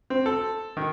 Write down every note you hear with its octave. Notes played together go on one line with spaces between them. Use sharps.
C4
A4
D#3